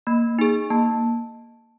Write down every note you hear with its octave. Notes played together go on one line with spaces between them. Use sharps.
A#3 B5
D#4 G#4
A#3 A5